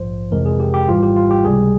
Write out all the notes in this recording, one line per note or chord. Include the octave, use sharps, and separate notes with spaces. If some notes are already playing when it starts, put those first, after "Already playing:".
Already playing: A#1 G#2 F3 C5
F2 C3 E3 G#3 A#4
G#4
G4
G4
G#1 G#2 E3 G3 F4
G4
F4
G4
C#2 C3 G3 G#4